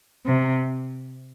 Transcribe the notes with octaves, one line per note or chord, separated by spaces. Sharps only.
C3